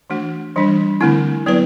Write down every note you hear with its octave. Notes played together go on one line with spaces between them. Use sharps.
E3 A3 D4 F#4
E3 G3 D4
D3 A3 C4 E4
F#3 B3 E4 B4 D5